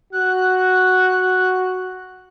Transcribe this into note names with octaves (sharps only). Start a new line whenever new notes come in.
F#4 F#6